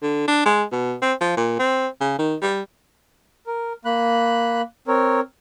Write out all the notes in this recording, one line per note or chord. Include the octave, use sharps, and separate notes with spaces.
D3
D4
G#3
B2
C4
F3
A#2
C4
C#3
D#3
G3
A#4
A#3 B5 F#6
C4 A#4 C#5